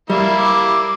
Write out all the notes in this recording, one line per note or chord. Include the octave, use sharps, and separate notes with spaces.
G3 A#3 E4 E5
D6